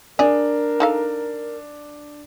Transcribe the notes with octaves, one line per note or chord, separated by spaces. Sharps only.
D4 G#4 A#4
D#4 A4 F5